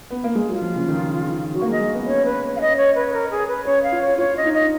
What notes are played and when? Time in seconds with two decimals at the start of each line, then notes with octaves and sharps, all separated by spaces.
0.11 B3
0.24 A#3
0.35 G#3
0.49 F#3 F4
0.62 F3
0.75 C#3
0.88 D#3
1.54 F#3 F#4
1.62 A#3
1.68 G#3
1.71 D#5
1.80 G#3
1.94 B3
2.07 C#4 C#5
2.25 B4
2.56 F5
2.60 C#4 D#5
2.77 C#5
2.95 B4
3.13 A#4
3.31 G#4
3.48 B4
3.65 C#4 C#5
3.83 F5
3.92 F4
4.02 C#5
4.18 F4 C#5
4.37 D#5
4.45 D#4
4.53 D#5